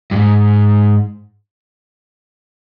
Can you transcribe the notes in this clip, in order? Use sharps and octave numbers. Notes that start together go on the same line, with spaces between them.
G2
G#2